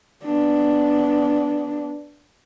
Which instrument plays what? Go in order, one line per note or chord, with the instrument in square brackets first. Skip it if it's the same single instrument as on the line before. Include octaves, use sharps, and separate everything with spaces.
[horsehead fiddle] B3 D4